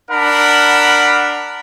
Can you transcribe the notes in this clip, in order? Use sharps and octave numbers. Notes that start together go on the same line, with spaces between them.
D4 A#4 F#5 B5